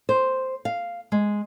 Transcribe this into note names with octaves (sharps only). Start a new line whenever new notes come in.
C5
F5
G#3